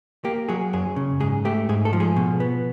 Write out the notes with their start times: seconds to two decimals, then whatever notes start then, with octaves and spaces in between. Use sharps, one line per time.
0.25 A#3 G4
0.49 F#3 G#4
0.73 F#2 G#4
0.96 C#3
1.20 G#2 G#4
1.45 A3 G4
1.69 G#2 G#4
1.85 A4
1.93 F3
2.00 G#4
2.16 B2
2.40 B3